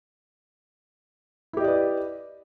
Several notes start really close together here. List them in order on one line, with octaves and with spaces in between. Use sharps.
E4 G4 D#5 D5 B4